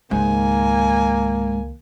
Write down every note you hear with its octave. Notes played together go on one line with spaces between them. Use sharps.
C#2 G#2 D#3 A#3 G#5